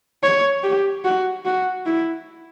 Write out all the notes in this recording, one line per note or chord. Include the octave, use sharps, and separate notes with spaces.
C#5
G4
F#4
F#4
E4